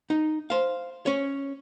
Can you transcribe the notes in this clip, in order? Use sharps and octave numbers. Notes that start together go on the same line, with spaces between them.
D#4
C5 F5
C#4 C#5